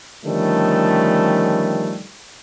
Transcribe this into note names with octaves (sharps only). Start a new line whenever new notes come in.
D3 D#3 F3 G3 A3 C#4